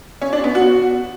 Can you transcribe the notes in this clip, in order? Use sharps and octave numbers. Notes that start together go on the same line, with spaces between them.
C#4
D4
B3
F#4